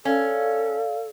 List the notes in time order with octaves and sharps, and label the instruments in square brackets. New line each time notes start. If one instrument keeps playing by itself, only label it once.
[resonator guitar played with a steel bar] C#4 [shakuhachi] A4 [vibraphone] D5 F5